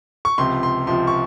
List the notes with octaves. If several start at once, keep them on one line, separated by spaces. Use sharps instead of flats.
C#6
C#2 C3 F3 C6
C6
C#2 C3 F3 C6
C#6